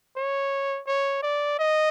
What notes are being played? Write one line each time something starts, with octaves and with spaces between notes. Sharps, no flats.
C#5
C#5
D5
D#5